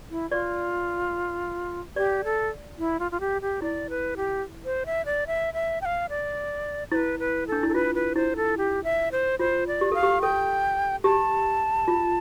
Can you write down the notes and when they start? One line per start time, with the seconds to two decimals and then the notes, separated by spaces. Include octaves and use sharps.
0.11 E4
0.31 F4 D5
1.96 G4 D5
2.24 A4
2.79 E4
3.00 F4
3.12 F4
3.20 G4
3.42 G4
3.62 E4 D5
3.90 B4
4.17 G4
4.65 C5
4.86 E5
5.06 D5
5.27 E5
5.54 E5
5.82 G5
5.85 F5
6.09 D5
6.91 E4 B4 C5
7.19 B4
7.47 D4 A4
7.63 E4
7.69 A4
7.74 F4 B4
7.95 B4
8.15 E4 C5
8.36 A4
8.58 G4
8.84 E5
9.12 C5
9.39 F4 C5
9.67 D5
9.81 G4
9.92 A4 F5
10.03 G4
10.22 A4 G5
11.04 G4 A5
11.88 F4